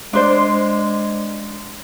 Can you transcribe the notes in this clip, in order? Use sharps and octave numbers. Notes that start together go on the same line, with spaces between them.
G#3 D4 C5 D5